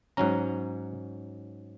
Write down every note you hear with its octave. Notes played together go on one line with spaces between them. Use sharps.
G#2 F#3 C#4 A#5